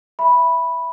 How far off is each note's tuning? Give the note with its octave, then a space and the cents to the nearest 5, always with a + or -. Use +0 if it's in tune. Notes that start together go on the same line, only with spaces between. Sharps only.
E5 +0 B5 -5